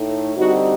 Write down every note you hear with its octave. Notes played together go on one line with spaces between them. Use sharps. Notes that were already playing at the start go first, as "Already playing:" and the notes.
Already playing: A2 A3 D#4
D3 G3 C4 D#4 F#4